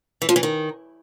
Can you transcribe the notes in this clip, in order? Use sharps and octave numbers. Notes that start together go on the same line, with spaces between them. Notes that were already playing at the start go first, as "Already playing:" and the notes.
E3
F3
E3
D#3